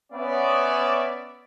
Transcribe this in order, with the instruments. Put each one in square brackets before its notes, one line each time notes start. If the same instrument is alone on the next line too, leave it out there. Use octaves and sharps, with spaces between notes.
[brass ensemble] B3 C#4 D5 E5